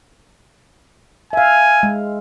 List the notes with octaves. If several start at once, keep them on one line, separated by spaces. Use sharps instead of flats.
E5 F5 G#5
G#3